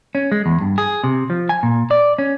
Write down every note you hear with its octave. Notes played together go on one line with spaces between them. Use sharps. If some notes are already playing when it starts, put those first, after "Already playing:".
C#4
G#3
E2
G2
G#4
C3
F3
G#5
A#2
D5
C#4